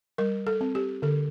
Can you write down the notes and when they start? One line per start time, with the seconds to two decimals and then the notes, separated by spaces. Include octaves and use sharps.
0.18 G3 A#4
0.47 A4
0.61 C4
0.75 G4
1.02 D3 A4